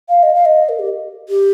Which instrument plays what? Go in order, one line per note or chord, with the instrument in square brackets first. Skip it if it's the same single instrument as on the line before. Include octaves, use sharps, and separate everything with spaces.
[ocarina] F5
D#5
F5
D#5
A#4
G4
G4